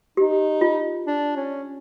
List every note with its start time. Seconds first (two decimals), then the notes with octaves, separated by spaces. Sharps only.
0.17 D#4 G4
0.61 F4
1.06 D4
1.36 C#4